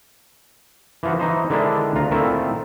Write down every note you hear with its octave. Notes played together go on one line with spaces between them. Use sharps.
E3 F3 F#4
E3 D#4 C5
D3 D#3 G#3 D4 E4
D2 F4 A#5
A#2 D#3 A3 C4 E4